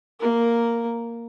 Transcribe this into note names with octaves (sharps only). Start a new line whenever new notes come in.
A#3 A#4